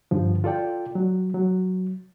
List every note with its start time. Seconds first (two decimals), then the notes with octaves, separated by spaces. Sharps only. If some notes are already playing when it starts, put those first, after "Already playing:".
0.11 G2 D3 F3
0.44 F4 A4 D5 G5
0.95 F#3
1.34 F#3